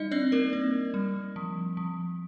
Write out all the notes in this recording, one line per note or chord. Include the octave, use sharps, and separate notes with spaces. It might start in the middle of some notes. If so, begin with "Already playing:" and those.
Already playing: G3 D#4 D#5
C4 D4 D5
A#3 A#4
C4
G3
F3
F3